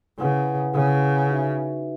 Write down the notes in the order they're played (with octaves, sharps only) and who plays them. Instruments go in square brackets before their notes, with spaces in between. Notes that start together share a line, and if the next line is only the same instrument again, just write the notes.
[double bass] C#3 [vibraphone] E4 B4 F#5
[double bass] C#3 [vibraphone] E4 B4 F#5
[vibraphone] D#4 F#4 B4 E5